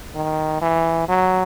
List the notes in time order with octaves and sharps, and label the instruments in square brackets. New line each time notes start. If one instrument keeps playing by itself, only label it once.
[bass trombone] D#3
E3
F#3